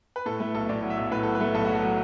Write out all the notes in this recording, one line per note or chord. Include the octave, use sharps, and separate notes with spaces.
B4
A2 A4
A3 B4
B1 A4
A2 D5
F#3
E5
B1
A2 B4
F#3 A4
B4
A3
B1 A4
F#3 F#4
A4
F#3